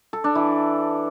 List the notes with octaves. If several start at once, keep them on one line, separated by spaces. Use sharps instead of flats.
A4
D4
E3